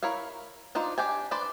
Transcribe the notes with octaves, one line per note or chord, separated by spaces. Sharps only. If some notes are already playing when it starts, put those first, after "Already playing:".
E4 A#4 C#5 E5 F5
D4 D#4 F4 C5
D4 G4 G5 G#5
D4 B4 C5 D5